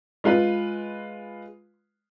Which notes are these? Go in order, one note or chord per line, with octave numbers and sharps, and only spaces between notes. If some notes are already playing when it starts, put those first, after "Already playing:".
G#3 F4 B4